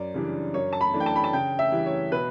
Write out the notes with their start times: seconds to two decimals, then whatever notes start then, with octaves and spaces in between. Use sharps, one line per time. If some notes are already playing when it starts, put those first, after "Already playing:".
Already playing: F#2 D5
0.14 C#3 E3 G3 D4
0.54 F#2 C#5
0.73 A5
0.81 B5
0.94 E3 A3 D4
1.00 G5
1.06 A5
1.16 B5
1.24 A5
1.33 C#3 G5
1.59 E5
1.72 E3 G3
1.86 C#5
2.12 B2 B4